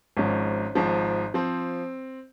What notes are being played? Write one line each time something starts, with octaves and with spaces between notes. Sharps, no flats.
G#1 G#2 F3 C#4
G#1 G#2 F3
F3 C4